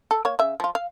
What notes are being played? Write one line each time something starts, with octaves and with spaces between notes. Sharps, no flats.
A4
A#3 C#5
C#3 E5
F3 F4
F5